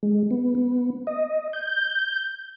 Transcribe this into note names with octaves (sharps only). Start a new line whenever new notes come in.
G#3
B3
B3
D#5
G6